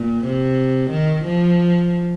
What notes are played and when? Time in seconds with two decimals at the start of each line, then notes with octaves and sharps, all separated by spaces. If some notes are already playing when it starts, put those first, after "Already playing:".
Already playing: A#2
0.25 C3
0.91 D#3
1.24 F3